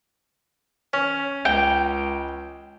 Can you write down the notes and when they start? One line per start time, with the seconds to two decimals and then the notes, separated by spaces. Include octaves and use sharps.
0.93 C#4
1.45 C#2 G5